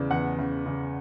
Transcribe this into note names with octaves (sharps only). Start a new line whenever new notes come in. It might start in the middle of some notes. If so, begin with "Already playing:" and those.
Already playing: E2 C#3 E3 D5
E2 F#5
C#3
C#3